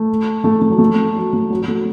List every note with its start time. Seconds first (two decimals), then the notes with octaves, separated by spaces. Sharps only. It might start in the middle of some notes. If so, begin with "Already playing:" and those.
Already playing: A3
0.44 A3
0.62 A3
0.70 F#3
0.78 A3
1.16 F#3
1.33 A3
1.51 F#3
1.62 F#3
1.68 A3